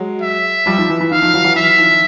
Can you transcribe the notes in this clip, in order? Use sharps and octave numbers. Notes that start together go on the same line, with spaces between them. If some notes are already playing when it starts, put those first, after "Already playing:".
Already playing: F#3 G#3
E5
F3 G3
D#3 F3
E3
E3
D#3 F5
D#3 F3
E3 F#3
E3 F#3
E3 E5
D#3 F3